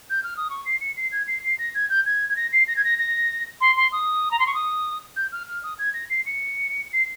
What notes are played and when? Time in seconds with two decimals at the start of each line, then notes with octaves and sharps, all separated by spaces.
0.10 G6
0.23 F6
0.37 D#6
0.50 C#6
0.65 C7
0.81 C#7
0.97 C7
1.12 G#6
1.28 C7
1.44 C7
1.59 A#6
1.75 G#6
1.90 G6
2.06 G#6
2.29 G#6
2.36 A#6
2.52 C7
2.68 A#6
2.77 G#6
2.84 A#6
2.99 A#6
3.61 C6
3.77 C6
3.92 D#6
4.31 A#5
4.39 C6
4.46 C#6
4.54 D#6
5.16 G6
5.32 F6
5.48 F6
5.63 D#6
5.79 G#6
5.94 A#6
6.10 C7
6.26 C#7
6.93 C7